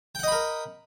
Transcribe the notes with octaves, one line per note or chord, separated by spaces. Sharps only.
A#4 D#5 F#5 G5 B5